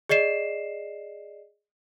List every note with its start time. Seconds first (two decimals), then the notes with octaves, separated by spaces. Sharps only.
0.09 G#4 D5 D#5 C7 E7